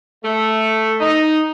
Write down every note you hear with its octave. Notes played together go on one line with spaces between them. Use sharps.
A3
D#4